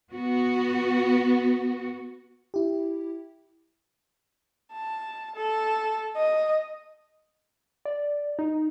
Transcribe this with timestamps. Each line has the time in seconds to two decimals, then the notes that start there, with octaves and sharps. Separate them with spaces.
0.13 B3 F#4
2.54 E4 G4
4.72 A5
5.36 A4
6.17 D#5
7.85 D5
8.39 D#4